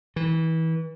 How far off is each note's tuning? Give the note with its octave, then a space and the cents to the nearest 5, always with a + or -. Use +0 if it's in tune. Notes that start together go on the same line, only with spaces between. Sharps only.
E3 -30